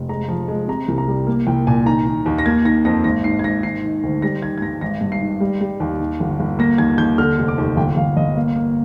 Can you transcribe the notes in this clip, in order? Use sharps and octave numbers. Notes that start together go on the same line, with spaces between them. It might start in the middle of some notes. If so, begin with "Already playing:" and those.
Already playing: F1
G#3 A#5
F3
G#3
C3 A#5
C2
A#5
G3
A#3
C2 G5
A#2 G#5
D#3 A#5
D#3
D#2
A#6
A#3 G#6
D#3 A#6
F2 A#6
G#1 A#6
G#2 C7
G#6
G#2 A#6
D#3 C7
D#3
D2
G3 A#6
D#3 G#6
G#6
G2 A#6
G#1 A#6
G2
C7
D#3
G3
G3
D#2
D#3
G1
G1
A#3 A#6
D#2 G#6
D#2 G6
D3 F6
F1
D6
D#2
G1 G5
G1 F5
G1 D#5
A#3 F5
A#3